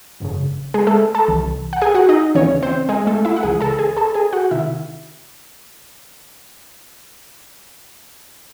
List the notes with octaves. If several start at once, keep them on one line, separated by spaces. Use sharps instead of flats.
G#1 F#2 C#3
G#3 G#4
A3 A4
A4 A5
C2 C3 E3
F#5
G#4 G#5
F#4 F#5
D#4 D#5
D#2 C#3 E3 C#4 C#5
C4 C5
G#3 G#4
A3 A4
E4 E5
F#5
C#2 C#3 E3 G#4 G#5
A4 A5
G#4 G#5
A4 A5
G#4 G#5
F#4 F#5
C3 D#3 E4 E5